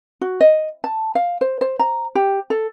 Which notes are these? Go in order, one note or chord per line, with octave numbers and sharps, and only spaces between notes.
F#4
D#5
A5
F5
C5
C5
A#5
G4
A4